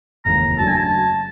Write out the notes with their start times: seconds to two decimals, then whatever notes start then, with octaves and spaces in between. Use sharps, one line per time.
0.25 F1 D#2 C#3 E3 G#3 A#5
0.58 F#2 C#3 F#3 A3 D4 A5
0.67 G#5
0.77 A5